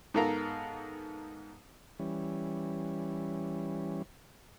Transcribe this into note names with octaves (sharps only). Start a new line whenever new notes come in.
G#2 B3 A4 A#4 F5 A#5
E3 G3 C#4